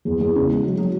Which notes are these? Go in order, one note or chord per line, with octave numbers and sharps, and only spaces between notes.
E2
E2
C#3
G#3
F#3
F#3